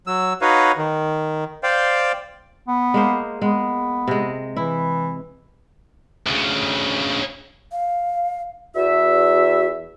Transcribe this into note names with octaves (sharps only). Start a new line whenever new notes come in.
F#3 E6
D#4 F#4 B4 C#5 D#5 F5
D#3
C5 D5 F5 G5
B3
G#3 A#3 C5
G#3 B3
C3 G#3
E3 E4
D2 C#3
F5
E2 F#4 E5